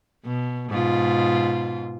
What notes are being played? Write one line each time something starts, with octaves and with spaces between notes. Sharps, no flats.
B2
G#2 B2 F4